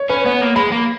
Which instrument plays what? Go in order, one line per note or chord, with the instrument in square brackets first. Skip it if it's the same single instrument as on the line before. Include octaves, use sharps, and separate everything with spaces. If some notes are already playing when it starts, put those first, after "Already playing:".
Already playing: [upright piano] C#5
[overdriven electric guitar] C#4 [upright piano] B4
[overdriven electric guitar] B3 [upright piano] C#5
[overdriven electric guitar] A#3
[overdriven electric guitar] G#3 [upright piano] B5
[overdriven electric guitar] A#3